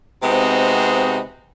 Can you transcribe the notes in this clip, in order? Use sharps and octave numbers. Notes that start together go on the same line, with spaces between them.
C3 G#3 B3 C4 D#4 F#4